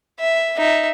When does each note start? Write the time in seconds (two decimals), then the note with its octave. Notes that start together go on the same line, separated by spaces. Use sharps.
0.20 E5
0.58 D#4 E5